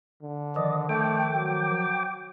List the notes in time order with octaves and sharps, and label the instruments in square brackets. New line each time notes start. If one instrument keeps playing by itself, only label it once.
[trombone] D3
[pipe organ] D#3 F3 [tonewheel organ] D5 D#5
[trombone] A3 [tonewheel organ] G5 D6
[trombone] F#3